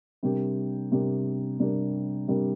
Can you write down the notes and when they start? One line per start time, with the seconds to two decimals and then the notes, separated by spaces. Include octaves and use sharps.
0.23 C3 G3 D4 G4 A#4
0.92 C3 G3 D4 G4 A#4
1.59 C3 G3 D4 G4 A#4
2.28 C3 G3 D4 G4 A#4